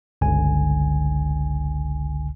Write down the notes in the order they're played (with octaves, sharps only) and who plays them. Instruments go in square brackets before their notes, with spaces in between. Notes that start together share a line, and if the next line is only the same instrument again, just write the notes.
[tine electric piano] G1 C#2 D3 G#5